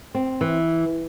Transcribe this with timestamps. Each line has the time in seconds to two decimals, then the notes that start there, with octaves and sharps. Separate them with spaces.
0.15 C4
0.41 E3